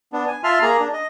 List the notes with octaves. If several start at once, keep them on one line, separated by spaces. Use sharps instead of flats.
B3 D4
G#5
F4 E5 A5 C6 F6
A#3 G#4 A#5
D4
D#5